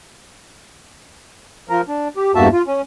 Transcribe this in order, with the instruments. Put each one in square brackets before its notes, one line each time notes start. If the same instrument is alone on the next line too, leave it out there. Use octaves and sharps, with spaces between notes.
[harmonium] F3 A#4
D4
G4
E2 G2 A#3 F#4 E5 A5
F4
C#4